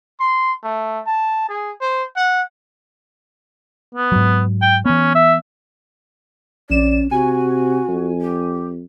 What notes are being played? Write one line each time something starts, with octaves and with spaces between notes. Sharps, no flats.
C6
A3
A5
G#4
C5
F#5
B3
G#2 F#3
G5
E3 B3 C#4
E5
A#1 C#4 D5 E7
C3 F#4 G#5
F2
G4